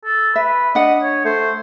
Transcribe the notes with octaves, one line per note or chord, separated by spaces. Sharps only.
A4
B4 E5
D4 D#5 F#5
C#5
A3 C5